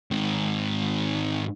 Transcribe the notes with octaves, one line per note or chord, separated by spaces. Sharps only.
G#2 D#3